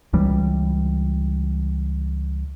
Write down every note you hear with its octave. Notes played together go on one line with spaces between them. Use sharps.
C#2 E3 G3